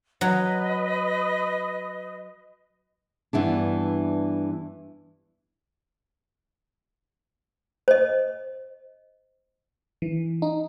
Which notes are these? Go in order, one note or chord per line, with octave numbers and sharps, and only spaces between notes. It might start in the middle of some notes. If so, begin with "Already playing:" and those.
F#3 B4 D#5
G2 E3 B3 D4
C5 D#5
E3
D#4